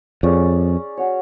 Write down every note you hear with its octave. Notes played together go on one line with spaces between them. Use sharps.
F2 C#4 G#4 D5
C#4 F#4 C#5